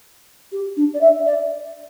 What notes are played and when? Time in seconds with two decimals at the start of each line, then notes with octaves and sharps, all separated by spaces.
0.52 G4
0.77 D4
0.94 D5
1.01 E5
1.26 D5